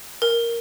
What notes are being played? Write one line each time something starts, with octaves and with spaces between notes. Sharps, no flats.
A#4